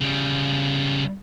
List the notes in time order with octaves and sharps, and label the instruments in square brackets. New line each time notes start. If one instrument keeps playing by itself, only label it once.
[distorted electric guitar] C#3 G3